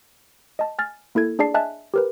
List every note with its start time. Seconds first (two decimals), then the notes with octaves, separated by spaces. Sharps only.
0.59 D#5 A5
0.79 G#5 F6 A6
1.15 A#3 E4 A4 G#6
1.39 D4 G#4 D5 A5 C7
1.54 D#5 E5 G#5 A5 F#6
1.94 G4 A#4 B4